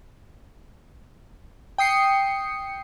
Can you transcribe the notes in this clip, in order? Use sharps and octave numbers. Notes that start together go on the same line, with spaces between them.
G5 D#6 C7 C#7